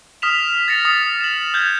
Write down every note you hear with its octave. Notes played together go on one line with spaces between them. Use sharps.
D#6 F6 B6 E7 F7
A6 A#6 C#7 F7
D#6
E7 F#7
F6 G6 G#6